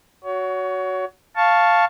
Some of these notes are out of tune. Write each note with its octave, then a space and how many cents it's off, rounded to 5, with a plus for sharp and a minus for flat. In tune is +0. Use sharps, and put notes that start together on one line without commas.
F#4 +0 C#5 +25
F5 +0 A5 +0 C#6 +0